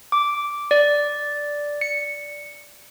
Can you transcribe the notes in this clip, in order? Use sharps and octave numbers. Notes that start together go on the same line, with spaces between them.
D6
D5
C#7